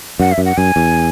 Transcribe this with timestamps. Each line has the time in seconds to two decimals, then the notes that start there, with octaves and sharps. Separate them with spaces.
0.20 F#2 F#5
0.32 E5
0.38 F#2
0.45 F#5
0.57 F#2 G#5
0.76 E2